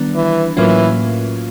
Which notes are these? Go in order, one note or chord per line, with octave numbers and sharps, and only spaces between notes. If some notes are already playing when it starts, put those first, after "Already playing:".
Already playing: D#3 G3 B3 D4
E3
A2 E3 F#3 A#3 C#4 F4